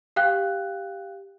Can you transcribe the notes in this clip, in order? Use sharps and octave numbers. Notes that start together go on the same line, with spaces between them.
G4 F5 G5 F#6